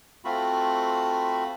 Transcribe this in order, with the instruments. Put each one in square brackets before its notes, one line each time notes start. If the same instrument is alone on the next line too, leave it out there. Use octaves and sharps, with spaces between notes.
[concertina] A3 C4 F4 F#4 B5